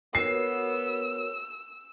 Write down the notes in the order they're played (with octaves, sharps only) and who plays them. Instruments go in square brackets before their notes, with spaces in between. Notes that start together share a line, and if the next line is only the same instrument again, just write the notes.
[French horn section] B3 [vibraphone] F#4 A#4 C#5 [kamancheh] E6 [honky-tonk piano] C7